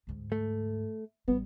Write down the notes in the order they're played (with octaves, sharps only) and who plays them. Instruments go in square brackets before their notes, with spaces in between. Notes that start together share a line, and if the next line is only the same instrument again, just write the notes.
[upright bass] D2 G#2
[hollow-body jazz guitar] A3
[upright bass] A1 G3 [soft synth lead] B3